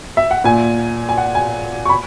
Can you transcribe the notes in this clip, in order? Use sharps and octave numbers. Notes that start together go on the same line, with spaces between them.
E5
F#5
A#2 G#5
G#5
F#5
G#5
C#6
B5